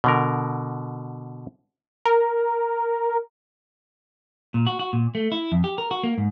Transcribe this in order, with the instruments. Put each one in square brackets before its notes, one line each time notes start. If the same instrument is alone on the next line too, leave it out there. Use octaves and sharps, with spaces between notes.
[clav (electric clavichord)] B2 D3 A#4
[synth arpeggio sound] A#4
[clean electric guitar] A#2
F#4
F#4
A#2
A3
E4
F2
G4
A#4
F#4
A#3
G#2